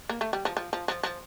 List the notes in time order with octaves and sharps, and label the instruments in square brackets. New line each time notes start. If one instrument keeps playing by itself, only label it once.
[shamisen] A#3
A3
G3
F3
F3
F3
F3
F3